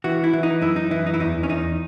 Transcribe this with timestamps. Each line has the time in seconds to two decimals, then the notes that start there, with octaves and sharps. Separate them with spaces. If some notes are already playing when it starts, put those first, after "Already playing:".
0.04 E3 F#4
0.24 E4
0.33 E3
0.43 D#4
0.61 F#2 E4
0.76 D#4
0.91 E3 E4
1.06 D#4
1.14 E4
1.20 E2 D#4
1.43 C#4
1.49 E2 D#4